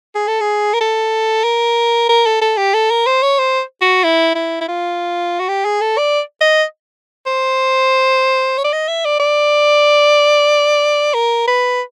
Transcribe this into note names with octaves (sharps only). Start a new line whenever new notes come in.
G#4
A4
G#4
A#4
A4
A#4
A#4
A4
A4
G4
A4
A#4
C5
C#5
C5
F#4
E4
E4
E4
F4
F#4
G4
G#4
A4
D5
D#5
C5
C#5
D5
D#5
E5
D5
D5
A#4
B4